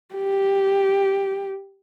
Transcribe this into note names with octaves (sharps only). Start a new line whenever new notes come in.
G4